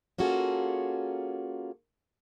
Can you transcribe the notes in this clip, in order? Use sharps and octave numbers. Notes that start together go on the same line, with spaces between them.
A#3 C#4 F4 F#4 G#4 A4